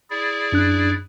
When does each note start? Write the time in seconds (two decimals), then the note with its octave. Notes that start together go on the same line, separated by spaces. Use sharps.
0.10 E4 G#4 D5
0.52 F#2 D4 F#6